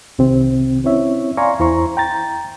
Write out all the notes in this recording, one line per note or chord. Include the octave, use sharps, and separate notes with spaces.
C2 C3 D#3 C4
C4 C#4 E4 C#5 E5
D5 F5 G#5 A#5 C6 C#6
E2 E4 C5 A#5 C6 C#6
G5 A#5 A6